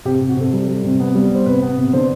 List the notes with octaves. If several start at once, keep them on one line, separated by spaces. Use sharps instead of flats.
C3 G4
C3
F#4
C3 A4
G3
G3
C3
B3
G3
B3 C5
C3 B4
B3
C3
D3 C5